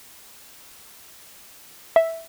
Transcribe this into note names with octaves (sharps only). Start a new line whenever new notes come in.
E5